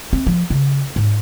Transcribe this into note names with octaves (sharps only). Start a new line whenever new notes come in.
C4
F3
C#3
G#2